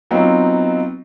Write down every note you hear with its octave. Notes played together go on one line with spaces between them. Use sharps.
F#3 B3 C4 D#4 F4